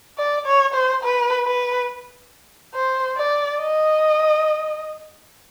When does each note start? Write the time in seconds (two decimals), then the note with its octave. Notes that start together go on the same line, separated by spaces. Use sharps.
0.18 D5
0.46 C#5
0.74 C5
1.03 B4
1.46 B4
2.74 C5
3.17 D5
3.60 D#5